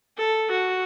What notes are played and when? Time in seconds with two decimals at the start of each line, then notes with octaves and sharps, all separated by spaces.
0.18 A4
0.51 F#4